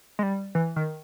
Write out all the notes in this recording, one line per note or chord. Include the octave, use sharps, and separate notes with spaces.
G#3
G3
E3
D#3